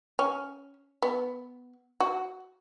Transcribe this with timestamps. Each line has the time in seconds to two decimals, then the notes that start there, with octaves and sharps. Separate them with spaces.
0.19 C#4
1.02 B3
2.00 F#4